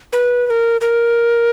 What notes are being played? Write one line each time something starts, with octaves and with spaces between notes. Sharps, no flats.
B4
B4
A#4
A#4